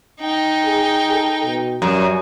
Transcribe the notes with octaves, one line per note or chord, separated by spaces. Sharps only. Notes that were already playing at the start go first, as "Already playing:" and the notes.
D#4 G5
G#4
A4
B2
F#2 G3